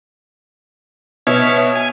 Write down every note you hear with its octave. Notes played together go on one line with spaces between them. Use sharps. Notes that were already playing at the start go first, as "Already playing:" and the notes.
B2 C#5 E5 F6
G#5